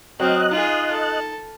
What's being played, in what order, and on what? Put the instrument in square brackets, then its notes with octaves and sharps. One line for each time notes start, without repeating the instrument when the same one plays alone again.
[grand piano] F#3 F6 [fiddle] C4 [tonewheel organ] D#5 F#6
[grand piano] D#4 [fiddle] F4 G#4
[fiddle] A4